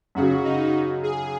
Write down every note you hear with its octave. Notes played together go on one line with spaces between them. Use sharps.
F#2 C#3 F#3 F#4
D#4
G#4